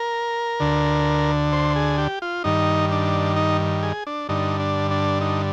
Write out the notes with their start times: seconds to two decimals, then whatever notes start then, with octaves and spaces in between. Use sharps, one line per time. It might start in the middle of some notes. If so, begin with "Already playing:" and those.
Already playing: A#4
0.60 D2 D3
1.53 C5
1.76 G#4
1.98 G4
2.22 F4
2.44 G2 D#3 D#4
2.91 D4
3.36 D#4
3.83 G#4
4.07 D4
4.29 G2 D3 D#4
4.60 D4
4.91 D4
5.21 D#4